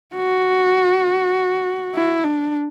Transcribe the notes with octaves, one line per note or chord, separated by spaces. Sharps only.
F#4
E4
D4